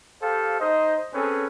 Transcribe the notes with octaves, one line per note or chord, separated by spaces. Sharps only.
G4 A4 C5 F5
D#4 C5 D#5
C4 C#4 G#4 A4 B4